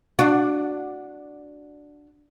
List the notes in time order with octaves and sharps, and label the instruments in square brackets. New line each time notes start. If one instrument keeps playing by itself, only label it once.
[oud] D4 F#4